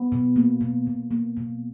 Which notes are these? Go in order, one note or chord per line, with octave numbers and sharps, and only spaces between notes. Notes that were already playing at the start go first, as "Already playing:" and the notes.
Already playing: B3
B2
A#3
B2
B2
A#3
B2